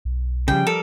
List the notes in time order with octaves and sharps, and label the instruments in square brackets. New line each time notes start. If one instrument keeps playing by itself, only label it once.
[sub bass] B1
[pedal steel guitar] C#3 [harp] F3 G3 D5 [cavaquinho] G5
[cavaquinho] A4 [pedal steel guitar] A#4